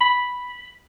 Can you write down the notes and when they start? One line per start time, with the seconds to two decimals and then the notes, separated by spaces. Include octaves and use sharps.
0.01 B5